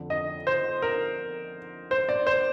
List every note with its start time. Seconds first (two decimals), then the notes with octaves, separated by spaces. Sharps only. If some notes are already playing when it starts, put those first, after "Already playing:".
Already playing: F2 D3
0.10 D#5
0.47 C5
0.82 A#4
1.91 C5
2.09 D5
2.27 C5